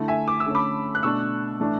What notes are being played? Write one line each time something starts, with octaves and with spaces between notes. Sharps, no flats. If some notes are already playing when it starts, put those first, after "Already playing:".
Already playing: D3 A3 E4
E5 G#5
D6
E6
D3 A3 C#4
B5 D6
F#6
B2 A3 D4 C#6 E6
A2 E3 A3 D4